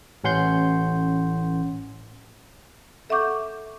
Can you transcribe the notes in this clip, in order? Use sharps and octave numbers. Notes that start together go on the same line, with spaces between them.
A1 C#4 F#5 C6 G6
A4 E5 F#5 C#6 D6 G6